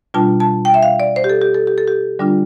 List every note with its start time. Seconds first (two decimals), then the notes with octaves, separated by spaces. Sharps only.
0.14 B2 G3 D4 F4 A5
0.40 A5
0.65 G5
0.74 E5
0.83 F5
1.00 D5
1.16 C5
1.24 G4
1.29 A4
1.41 G4
1.54 A4
1.67 G4
1.78 A4
1.88 G4
2.19 D3 G3 D4 F4